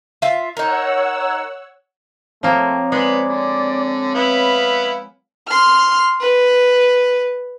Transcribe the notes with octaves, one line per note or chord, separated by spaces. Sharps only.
F4 E5
D#4 A#4 C#5 F#5 E6
F3 A3 A#3 C4 C#5
G#3 B3 D5
D3
B3 E4 F5
C6 F6
B4